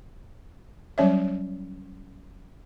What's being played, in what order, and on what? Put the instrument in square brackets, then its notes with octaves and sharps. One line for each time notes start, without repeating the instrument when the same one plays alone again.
[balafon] F#3 G3 C#4 C#5 E5